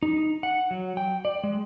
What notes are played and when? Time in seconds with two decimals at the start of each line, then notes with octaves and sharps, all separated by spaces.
0.03 D#4
0.43 F#5
0.71 F#3
0.97 G5
1.25 D5
1.44 G#3